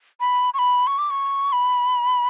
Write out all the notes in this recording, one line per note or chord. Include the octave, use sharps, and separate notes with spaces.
B5
C#6
B5
C#6
D6
C#6
B5